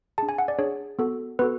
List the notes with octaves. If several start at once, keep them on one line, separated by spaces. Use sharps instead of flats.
D4 G#4 A5
G#5
F#5
D5
D4 G#4 C#5
B3 F#4 A4
B3 F#4 A4 B4